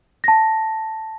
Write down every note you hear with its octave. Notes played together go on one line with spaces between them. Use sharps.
A5 A#6